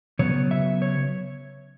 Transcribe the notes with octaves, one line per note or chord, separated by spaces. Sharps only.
C#3 F#3 B3 C#5
E5
C#5